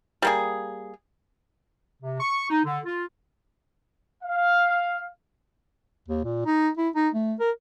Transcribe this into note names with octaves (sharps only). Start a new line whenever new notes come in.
G3 A#3 G#4
C3
C#6
D#4
D3
F4
F5
D#2
A#2
D#4
E4
D#4
A3
A#4